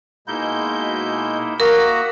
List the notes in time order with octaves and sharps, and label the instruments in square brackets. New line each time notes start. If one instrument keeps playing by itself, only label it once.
[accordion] B2 G#3 G6 [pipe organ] A#3 D#4 E4
[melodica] A#3 F#4 A#5 [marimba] A#4 [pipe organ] E5 F#5 D#6